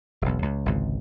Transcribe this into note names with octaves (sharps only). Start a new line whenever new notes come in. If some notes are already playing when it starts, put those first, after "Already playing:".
E1 B1
C#2
G#1 C#2 C3